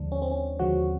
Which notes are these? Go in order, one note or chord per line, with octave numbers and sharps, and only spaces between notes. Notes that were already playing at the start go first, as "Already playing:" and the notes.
Already playing: D#2 D3 F3 G#3 D4
C#4
C4
C#4
D#2 D3 F3 G#3 F#4